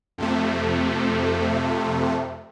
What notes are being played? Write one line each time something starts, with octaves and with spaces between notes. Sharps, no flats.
F2 C3 A3